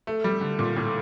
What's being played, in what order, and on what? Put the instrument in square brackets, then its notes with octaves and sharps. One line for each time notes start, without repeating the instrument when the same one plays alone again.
[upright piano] A3
G3
D3
A#2
A2